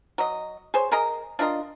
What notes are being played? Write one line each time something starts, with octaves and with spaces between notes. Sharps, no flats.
F#3 D#5
G#4 C5 C#5
G#4 A#4 D#5 A#5
D4 F4 A#4 D#5